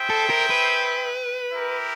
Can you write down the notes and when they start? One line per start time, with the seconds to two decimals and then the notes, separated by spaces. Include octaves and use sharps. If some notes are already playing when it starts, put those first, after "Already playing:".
Already playing: E4 G#4 C5 E5 G5
0.10 A4
0.30 A#4
0.50 B4
1.50 E4 G4 A#4